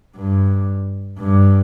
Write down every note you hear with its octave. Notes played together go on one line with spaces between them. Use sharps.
G2
G2